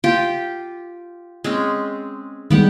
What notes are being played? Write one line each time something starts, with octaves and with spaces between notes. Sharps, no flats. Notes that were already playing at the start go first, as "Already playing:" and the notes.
F4 G4 G5
G#3 C4 C#4
D#3 G3 G#3 B3 G4 F#5